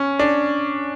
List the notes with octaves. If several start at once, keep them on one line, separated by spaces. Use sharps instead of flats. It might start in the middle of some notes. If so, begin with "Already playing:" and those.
Already playing: C#4
D4